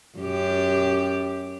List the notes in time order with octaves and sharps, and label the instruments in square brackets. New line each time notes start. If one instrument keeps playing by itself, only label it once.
[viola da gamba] F#2 G4